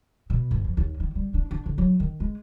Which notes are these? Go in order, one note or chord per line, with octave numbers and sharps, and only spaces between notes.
B2
G1
F2
D#2
D#3
G3
D4
D4
D3
F#3
D#3
G#3